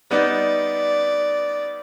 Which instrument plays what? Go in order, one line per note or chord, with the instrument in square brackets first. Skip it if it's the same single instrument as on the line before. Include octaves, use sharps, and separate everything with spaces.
[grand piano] G3 B3 D#4 [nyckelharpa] D5